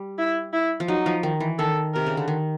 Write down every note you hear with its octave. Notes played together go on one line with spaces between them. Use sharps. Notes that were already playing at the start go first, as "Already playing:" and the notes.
Already playing: G3
E4
E4
F3
F#3 D#4
F3
D#3
E3
D#3 A4
C3 A#4
C#3
D3
D#3